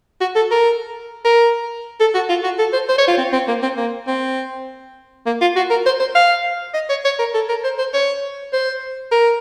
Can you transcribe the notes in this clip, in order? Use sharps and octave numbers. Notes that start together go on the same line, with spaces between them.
F#4
A4
A#4
A#4
A4
F#4
F4
F#4
A4
C5
C5
C#5
F4
C4
C4
A#3
C4
A#3
C4
A#3
F4
F#4
A#4
C5
C5
F5
D#5
C#5
C#5
A#4
A4
A#4
C5
C5
C#5
C5
A#4